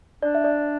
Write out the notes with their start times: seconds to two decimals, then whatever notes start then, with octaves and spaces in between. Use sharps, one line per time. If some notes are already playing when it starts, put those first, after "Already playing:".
0.22 D4 D5
0.35 E5
0.44 D5